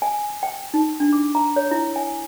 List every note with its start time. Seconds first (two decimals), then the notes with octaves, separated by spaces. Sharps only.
0.02 G#5
0.43 G5
0.74 D#4
1.00 D4
1.13 D6
1.35 A#5
1.56 C#5
1.71 E4
1.96 G#5